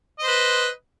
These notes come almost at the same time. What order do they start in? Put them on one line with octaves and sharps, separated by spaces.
D#5 C5 B4